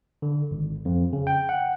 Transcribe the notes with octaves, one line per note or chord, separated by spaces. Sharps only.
D3
G#1
F2
C#3
G5
F#5